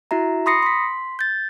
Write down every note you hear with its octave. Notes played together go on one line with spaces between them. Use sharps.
E4 F#4 E5 A#5
B5 C6 D#6 A#6 C7 C#7
C6 B6
G6 A6